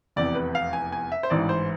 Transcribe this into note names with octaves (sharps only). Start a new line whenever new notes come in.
F1 E2 C3 D5
B4
F5
G#5
G#5
E5
C5
A1 G#2 E3 D5
C5